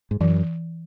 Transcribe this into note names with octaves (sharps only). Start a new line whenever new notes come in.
G#2
F#2 E3